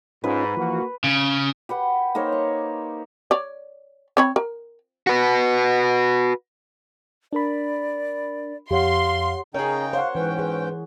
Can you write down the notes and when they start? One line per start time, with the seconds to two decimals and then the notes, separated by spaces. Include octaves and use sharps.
0.24 G#2 C#4 D#4 F4 B4
0.57 E3 F3 A#3 F#4
1.04 C#3
1.69 G4 B4 F#5
2.15 A#3 D#4 C5 C#5
2.32 C#6
3.31 C#5 D5
4.17 C4 C#5 B5
4.36 A#4
5.07 F#4 B4
7.33 D4 A#4 D5 B5
8.71 F2 G4 C#5 F5 F#5 C6
9.54 C#3 C#4 D#4 G#4 A#4 G5 A#5
9.93 C5 C#5 F5 F#5
10.15 G#2 E3 C#4 B4 G5
10.39 G#4 B4